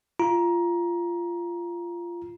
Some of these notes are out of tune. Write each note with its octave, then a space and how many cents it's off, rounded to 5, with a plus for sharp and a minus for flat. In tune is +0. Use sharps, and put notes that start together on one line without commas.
F4 -15 A#5 +20